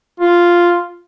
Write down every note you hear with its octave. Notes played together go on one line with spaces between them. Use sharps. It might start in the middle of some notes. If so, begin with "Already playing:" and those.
F4